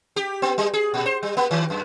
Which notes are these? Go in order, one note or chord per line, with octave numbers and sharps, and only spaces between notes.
G4
B3
G3
G#4
A#2
C5
G3
A#3
D#3
F#2